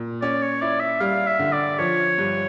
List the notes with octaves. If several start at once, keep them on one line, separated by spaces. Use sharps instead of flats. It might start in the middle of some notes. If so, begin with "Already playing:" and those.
Already playing: A#2
C#4 D5
C#5
E4 D5
E5
G3 F5
E5
D3
D5
F3 C#5
G2